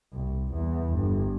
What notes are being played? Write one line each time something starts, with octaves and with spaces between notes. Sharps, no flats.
C2
E2
G1